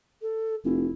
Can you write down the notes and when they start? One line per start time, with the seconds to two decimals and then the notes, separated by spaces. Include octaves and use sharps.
0.22 A4
0.64 F1 E4